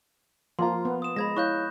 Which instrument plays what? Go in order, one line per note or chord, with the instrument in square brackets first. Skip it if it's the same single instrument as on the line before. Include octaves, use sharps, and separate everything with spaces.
[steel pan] F3 [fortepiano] A#3 F4 A#5 [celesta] C6
[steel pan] B3
[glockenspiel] D#6 E7
[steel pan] G#3 [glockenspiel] B5 G#6 A#6
[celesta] E4 C#5 F5 [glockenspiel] C#6 F#6 G6